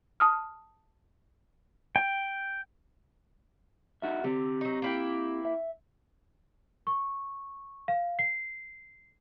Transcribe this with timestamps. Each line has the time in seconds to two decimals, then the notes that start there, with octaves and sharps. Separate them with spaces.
0.20 A5 D#6 F6
1.96 G5
4.02 D#4 F#4 E5
4.24 D3 C4 G4
4.61 F#3 D#4
4.82 A#3 E4 G5
5.45 E5
6.87 C#6
7.88 F5
8.19 C7